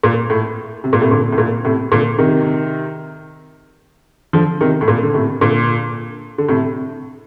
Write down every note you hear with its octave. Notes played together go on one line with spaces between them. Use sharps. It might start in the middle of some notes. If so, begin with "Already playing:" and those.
A#2
A2
C3
A#2
A2 C3
A#2 D3
A2
A#2
A2 C3
A#2 D3
C3 D#3
D3 F3
C3 D#3
A2
A#2
D3
A2 C3
A#2 D3
D3
A2 C3